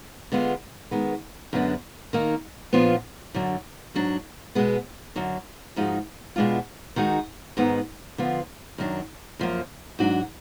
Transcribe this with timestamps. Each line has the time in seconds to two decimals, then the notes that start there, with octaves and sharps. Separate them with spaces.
0.32 D3 G#3 B3 F4
0.91 D#3 G#3 B3
1.53 F#2 D3 G#3 B3 D4
2.13 D#3 A#3 D#4
2.73 A#2 F3 B3 D4 F4
3.34 F#2 D3 F#3 D4
3.94 G#2 F#3 D4
4.55 B2 G#3 B3
5.16 F#2 D3 F#3
5.76 G#2 F3 G#3 D#4 F#4
6.36 B2 G#3 B3 D4 F4
6.96 D#3 G#3 D#4 F#4
7.57 G#2 D#3 G#3 B3
8.18 D3 F3 B3 F4
8.78 F#2 D#3 F#3 D4
9.39 F#2 F3 A#3
9.99 G#2 F#3 D4 F#4